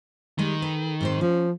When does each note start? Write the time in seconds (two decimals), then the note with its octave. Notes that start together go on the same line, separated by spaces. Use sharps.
0.38 D#3 G3 G#3
0.62 A4 B4
1.01 G#2 C4 C5
1.21 F3 C#4